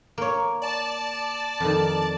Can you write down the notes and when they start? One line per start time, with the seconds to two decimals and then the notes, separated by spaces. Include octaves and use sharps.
0.18 A#3 C#5
0.62 D5 A5
1.60 F2 D#3